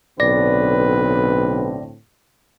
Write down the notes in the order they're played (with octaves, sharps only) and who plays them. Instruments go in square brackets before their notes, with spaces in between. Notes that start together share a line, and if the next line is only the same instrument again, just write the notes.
[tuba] B1 [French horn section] A2 D3 C4 [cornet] B4 [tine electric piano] D5 A#6